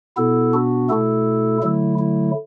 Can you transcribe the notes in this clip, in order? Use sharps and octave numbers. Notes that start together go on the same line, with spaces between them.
B2 B3 E4 A4
D4 F#4
B2 A3 E4 A4
D3 F#3 A3 E4
E4